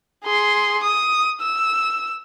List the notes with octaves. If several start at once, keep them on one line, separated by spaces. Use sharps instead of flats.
G#4 C6
D#6
E6